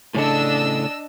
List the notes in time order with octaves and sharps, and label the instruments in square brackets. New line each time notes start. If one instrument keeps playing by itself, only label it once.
[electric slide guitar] A2 C#3 A4 [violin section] D4 D#5 E6